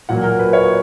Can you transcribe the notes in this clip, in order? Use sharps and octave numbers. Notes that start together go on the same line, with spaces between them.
A#2 F#3 A#3 F#5
A#4
B4
C#5